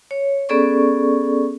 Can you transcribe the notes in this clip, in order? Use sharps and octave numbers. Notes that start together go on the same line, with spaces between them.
C#5
B3 C#4 G#4 A4 D5 C#6